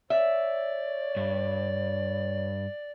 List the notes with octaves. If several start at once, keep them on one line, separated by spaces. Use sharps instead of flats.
C#5 D5 E5
G2